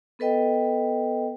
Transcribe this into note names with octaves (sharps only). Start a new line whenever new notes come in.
B3 A4 B4 D#5 G5